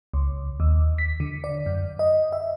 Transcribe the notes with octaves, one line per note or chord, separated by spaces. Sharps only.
C#2
D#2
B6
D3
D5
F#2
D#5
E5